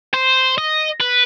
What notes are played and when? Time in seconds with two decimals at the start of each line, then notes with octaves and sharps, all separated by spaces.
0.14 C5
0.58 D#5
1.00 B4